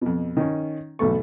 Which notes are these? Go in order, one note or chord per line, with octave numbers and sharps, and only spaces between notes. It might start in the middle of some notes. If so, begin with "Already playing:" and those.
F2 B2
D#3 C#4
B1 E2 A3 A4 C#6